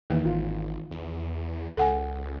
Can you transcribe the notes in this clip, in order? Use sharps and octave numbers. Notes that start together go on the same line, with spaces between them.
E2 D#3 E3 A#3
G#1 F4
E2
C#2 A4 F#5 G#5